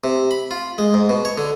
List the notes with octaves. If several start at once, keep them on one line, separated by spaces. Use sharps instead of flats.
C3
B5
F4
G#3
G#2
B2
C#5
D3